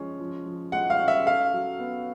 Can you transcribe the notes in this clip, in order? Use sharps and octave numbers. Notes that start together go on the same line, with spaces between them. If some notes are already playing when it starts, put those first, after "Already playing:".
Already playing: F3 G#3 C#4
F3
F3
G#3 F#5
F5
C#4
E5
A4 F5
F#3
B3